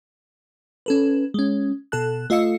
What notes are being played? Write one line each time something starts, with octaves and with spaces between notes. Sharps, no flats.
C#4 A4 B4
G#3 C#4
B2 A4 A5 F#6
A3 F4 D#5 F5 E6 C#7